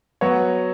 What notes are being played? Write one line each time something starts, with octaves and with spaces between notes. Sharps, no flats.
F#3 B3 F#4 C#5